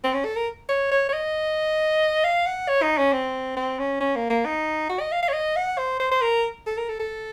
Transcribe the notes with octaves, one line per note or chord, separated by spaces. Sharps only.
C4
C#4
A4
A#4
C#5
C#5
C#5
D#5
F5
F#5
C#5
D#4
C#4
C4
C4
C#4
C#4
A#3
A#3
D#4
F#4
D#5
F5
F5
C#5
D#5
F#5
C5
C5
C5
A#4
A4
A#4
A4
A4